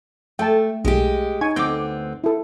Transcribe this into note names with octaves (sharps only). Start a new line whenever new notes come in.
A3 G5 A5
B1 G#3 G4
D#4 G#5 C#6 G#6
D2 B3 C4 D6 G6
E4 A4